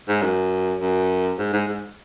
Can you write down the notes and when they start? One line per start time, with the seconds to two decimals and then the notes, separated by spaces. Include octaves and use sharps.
0.09 G#2
0.22 F#2
0.81 F#2
1.39 G#2
1.53 G#2
1.68 G#2